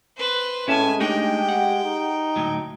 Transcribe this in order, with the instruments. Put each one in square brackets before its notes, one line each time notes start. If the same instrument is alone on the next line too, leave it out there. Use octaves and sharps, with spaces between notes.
[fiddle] B4 C5
[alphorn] A2 [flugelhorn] G#3 [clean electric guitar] C#4 E5 A5 [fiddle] G#5
[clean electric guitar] A3 D4 D#4 [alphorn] G4 [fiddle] G5
[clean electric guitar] F#5
[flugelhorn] D#4
[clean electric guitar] D2 A2 F#3